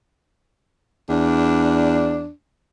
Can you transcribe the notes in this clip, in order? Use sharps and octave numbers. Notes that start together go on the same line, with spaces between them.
E2 D4